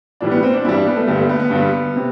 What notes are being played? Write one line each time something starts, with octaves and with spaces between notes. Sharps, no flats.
A2 E3 G3 D4
B3
C4
D4
G2 E3 G3 E4
D4
B3
A3
G2 D3 G3 B3
A3
B3
B3
G2 D3 G3
C3